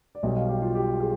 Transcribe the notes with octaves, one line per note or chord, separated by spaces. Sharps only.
D5
B1 B2 G3 D#5
F5
G4
F4
G4
G#4